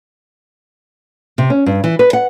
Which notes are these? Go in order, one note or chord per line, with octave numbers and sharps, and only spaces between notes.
C3
C#4
G2
E3
B4
F#5